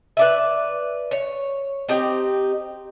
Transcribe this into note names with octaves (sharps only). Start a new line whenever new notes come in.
B4 D5 E5
C#5
C4 D#4 G4